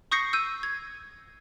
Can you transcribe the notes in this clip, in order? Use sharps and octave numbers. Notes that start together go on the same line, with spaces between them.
C#6 D#6 G6 A#6 C7 C#7
E6 G6 D#7
G#6